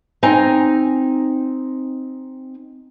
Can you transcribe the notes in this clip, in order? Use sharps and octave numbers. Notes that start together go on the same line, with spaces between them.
C4 D#4 G#5 A#5